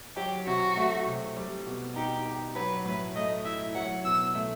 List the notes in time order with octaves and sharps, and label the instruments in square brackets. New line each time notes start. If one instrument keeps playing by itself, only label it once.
[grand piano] F#3 [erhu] G4
[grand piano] C3 [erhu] F#4
[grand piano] A3
C3
G3
B2
[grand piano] D#4 [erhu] G4
[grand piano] G4
[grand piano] F#3 [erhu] B4
[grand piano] A2 [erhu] B4
[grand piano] A3 [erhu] D#5
[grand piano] E4 [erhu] E5
[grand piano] F#3 [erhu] F#5
[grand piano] B2 [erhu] E6
[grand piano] A3